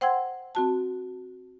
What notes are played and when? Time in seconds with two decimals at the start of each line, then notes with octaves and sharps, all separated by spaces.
0.01 C5 F#5 G5 C6 E6 G#6
0.55 C4 F#4 A5